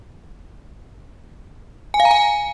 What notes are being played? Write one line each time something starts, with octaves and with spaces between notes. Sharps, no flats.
G#5
F5
A#5
G#5